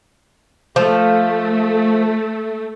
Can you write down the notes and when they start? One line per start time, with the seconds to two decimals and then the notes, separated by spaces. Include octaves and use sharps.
0.76 F3 A3